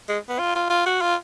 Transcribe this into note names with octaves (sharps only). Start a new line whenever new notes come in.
G#3
B3
F4
F4
F4
F#4
F4